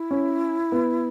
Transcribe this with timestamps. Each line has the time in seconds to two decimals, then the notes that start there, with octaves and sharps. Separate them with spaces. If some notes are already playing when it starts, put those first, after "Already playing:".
Already playing: E4
0.11 C#4
0.72 B3